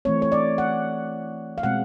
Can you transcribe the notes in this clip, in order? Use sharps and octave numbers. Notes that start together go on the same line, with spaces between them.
E3 A3 C4 C#5
C#5
D5
F#5
F5
B2 G#3 C4 F#5